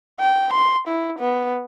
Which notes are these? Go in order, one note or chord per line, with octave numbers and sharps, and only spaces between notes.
G5
C6
E4
B3